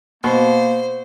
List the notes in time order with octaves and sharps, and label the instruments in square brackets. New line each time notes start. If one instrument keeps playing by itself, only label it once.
[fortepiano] B2 [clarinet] A#3 [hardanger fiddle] C5